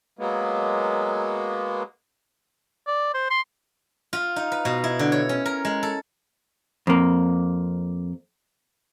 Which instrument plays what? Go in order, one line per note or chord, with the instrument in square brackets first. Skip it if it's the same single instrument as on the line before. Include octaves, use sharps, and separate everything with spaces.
[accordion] F#3 G#3 A#3 B3
[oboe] D5
C5
C6
[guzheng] F4
D#4
B4
B2
E4
D3
C#5
C#4
A#4
G#3
A4
[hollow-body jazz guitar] F2 A#3